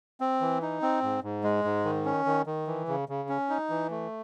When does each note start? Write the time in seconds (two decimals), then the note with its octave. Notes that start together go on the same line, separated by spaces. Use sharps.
0.20 C4
0.41 E3
0.62 D#4
0.82 C4
1.03 G#2
1.23 G#2
1.44 G#3
1.64 G#2
1.85 D#3
2.05 C#4
2.26 D#3
2.46 D#3
2.67 E3
2.88 C#3
3.09 C#3
3.29 C#4
3.49 D#4
3.70 E3
3.90 A3